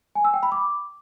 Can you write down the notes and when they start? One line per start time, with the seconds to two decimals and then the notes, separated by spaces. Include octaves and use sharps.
0.15 G#5
0.25 E6
0.34 G5
0.43 B5
0.52 D6